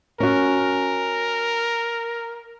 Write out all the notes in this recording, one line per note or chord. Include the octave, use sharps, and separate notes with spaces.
C#4 F#4 A#4